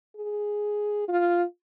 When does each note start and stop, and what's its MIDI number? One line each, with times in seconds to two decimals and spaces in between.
0.16 1.05 68
1.08 1.44 65